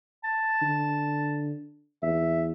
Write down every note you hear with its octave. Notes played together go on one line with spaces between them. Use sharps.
A5
D3
E2 E5